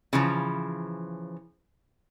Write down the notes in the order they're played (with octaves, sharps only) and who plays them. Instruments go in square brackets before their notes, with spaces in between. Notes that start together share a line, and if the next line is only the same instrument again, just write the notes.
[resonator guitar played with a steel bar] C#3 E3 F3